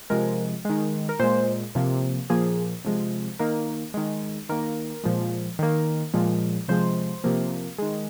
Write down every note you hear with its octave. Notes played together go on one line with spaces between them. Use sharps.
C3 F3 G#3 A#4
D#3 G#3
A#4
A#2 G#3 C5
C3 F3 A#3
A#2 F3 A#3 G#4
C3 F3 G#3
D#3 A#3 A#4
D#3 G#3
D#3 A#3 A#4
A#2 F3 G#3
D#3 A#3
A#2 F3 G#3
C3 F3 G#3 C5
C3 F3 A#3
D#3 G#3